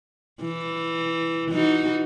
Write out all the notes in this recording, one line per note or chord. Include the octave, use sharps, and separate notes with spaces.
E3
E3 D#4 F#4